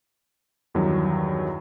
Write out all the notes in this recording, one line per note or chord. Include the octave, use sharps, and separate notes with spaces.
E2 G2 D#3 E3 F#3